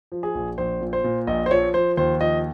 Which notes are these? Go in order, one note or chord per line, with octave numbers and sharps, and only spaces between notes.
F3
G#4
A#1
A#1 C5
A#2
C5
A#2
A#1 D#5
C5
F3 C#5
F3 C5
D#2 C5
F3 D#5